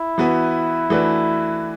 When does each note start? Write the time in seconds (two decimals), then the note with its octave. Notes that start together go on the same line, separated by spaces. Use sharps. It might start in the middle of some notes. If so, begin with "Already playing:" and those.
Already playing: E4
0.18 E3 B3 F#4 B4
0.90 E3 A3 D4 F#4 B4